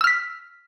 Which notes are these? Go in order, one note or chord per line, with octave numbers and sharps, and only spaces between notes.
E6 F6 B6